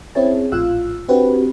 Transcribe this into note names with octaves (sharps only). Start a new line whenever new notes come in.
C4 C#4 E4 G#4 C#5 A5
A#1 A2 F4 F5 E6 F#6
C4 D4 F#4 G4 B4